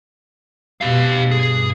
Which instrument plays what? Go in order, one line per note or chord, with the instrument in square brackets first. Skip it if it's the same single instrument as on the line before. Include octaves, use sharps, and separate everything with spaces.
[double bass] B2 [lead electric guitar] G4 F5
[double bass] G2 [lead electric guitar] G#4